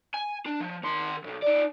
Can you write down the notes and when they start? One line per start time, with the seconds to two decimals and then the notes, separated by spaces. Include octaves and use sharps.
0.14 G#5
0.46 D4
0.60 F3
0.83 D#3 C6
1.24 B1 F2
1.42 D#4 D5